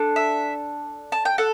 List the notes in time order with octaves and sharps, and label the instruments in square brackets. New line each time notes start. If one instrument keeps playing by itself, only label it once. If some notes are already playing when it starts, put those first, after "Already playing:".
Already playing: [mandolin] D4 A4
E5
A5
G5
A4 F#5